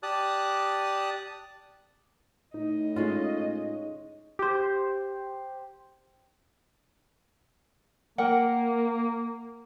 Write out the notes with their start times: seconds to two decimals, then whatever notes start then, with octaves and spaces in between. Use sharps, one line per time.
0.03 G4 D5 A5 D#6 F#6
2.54 A2 D#4 D#5
2.96 G#3 C#4 F4
4.39 G4 C5
8.18 A#3 A#4 F#5 G5